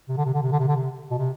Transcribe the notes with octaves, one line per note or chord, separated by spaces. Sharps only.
C3
D3
C3
D3
C3
D3
C3
D3
C3
B2
C3